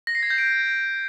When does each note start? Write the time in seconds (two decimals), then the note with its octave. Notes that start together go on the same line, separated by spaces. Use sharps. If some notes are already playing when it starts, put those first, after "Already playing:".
0.07 A#6
0.15 C7
0.23 G#6
0.30 G6
0.38 D7